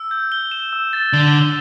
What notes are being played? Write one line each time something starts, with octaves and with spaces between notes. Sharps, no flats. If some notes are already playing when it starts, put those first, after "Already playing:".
Already playing: E6
G6
G7
E7
E6
A6
D3 G7
E7